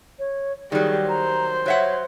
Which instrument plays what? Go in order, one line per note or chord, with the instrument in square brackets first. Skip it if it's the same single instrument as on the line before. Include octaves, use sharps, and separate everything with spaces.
[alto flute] C#5
[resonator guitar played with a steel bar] D#3 F#3 [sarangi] G3 [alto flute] G#4
[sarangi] C5 [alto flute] A#5
[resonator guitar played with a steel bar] F#3 E5 F#5 [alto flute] C#5